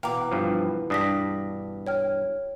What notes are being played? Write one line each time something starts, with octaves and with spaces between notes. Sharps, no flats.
B2 E3 F5 G5 A#5 D6
G2 F3
G2 D4 D#6 A#6 B6
C#5 G5 F6